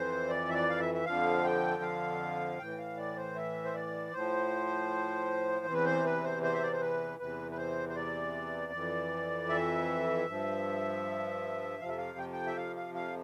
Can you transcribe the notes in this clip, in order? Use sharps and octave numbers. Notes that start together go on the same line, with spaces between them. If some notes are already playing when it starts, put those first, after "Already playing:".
Already playing: F2 E3 C5
D5
E5
D5
F5
E5
E5
F2 D3 F3 F5
G5
F5
A2 E3 G5
F5
D5
C5
E5
C5
D5
A2 F3 C5
E2 C3 E3
B4
C5
B4
C5
C5
E5
D5
C5
B4
E2 C3 E3 B4
B4
C5
C5
D5
F2 E3
E5
G2 F3
F2 C3 F3 F5
E5
F5
G5
G5
E5
F5
F5
F5